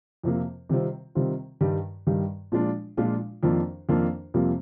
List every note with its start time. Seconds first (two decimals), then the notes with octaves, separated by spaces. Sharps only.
0.23 F2 C3 F3 A#3
0.69 C3 D#3 G3 C4 F4
1.15 C3 D#3 G3 C4 F4
1.61 G2 D#3 G3
2.07 G2 D#3 G3
2.52 A#2 F3 G#3 D4 F4
2.97 A#2 F3 G#3 D4 F4
3.43 F2 D#3 A#3 D4 F4
3.89 F2 D#3 A#3 D4 F4
4.34 F2 C3 G3 A#3 F4